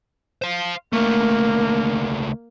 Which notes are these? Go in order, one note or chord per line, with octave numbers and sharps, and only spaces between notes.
C5 F5
C#2 A3 A#3